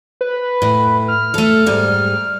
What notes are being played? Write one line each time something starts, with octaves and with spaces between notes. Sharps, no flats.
B4
A2
F6
A3 A4
G#2 G3